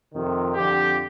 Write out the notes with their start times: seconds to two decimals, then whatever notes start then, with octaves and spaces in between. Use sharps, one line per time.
0.12 F2 C3 D#3
0.54 F2 D3 F3 G4